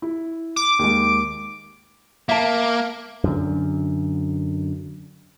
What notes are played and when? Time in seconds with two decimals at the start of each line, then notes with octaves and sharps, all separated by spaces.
0.02 E4
0.56 D6
0.79 D#2 G#3
2.29 A#3 E5 A5
3.24 F#2 D3